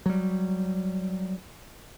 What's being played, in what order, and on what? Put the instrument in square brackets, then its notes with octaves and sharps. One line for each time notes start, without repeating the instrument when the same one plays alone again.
[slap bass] F#3 G3